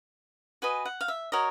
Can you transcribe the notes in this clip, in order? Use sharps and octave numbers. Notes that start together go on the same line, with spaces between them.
F#4 B4 D#5 G#5
F#5
F5
E5
F#4 A#4 C#5 D#5